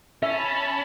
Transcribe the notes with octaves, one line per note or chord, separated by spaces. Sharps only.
C#4 E5 A5 B5